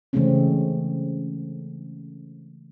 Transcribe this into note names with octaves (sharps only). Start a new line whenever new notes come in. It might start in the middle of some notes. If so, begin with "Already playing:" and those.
C#3 E3 G#3 A3 C4 C#4